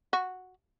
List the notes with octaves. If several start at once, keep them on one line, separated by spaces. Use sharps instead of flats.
F#4